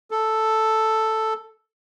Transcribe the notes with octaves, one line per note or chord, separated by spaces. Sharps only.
A4